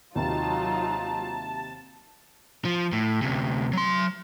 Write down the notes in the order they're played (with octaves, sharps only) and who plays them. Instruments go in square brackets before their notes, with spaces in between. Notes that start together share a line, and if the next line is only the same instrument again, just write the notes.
[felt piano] D#2 C3 [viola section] F#3 D#4 F4 [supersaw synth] A5 [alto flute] A#5
[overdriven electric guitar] F3
A2
D2 C3
F#3 C6